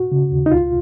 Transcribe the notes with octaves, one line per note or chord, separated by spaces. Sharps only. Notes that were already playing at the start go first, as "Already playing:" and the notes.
Already playing: F#4
C#3
D#2
D#4
C#2 F4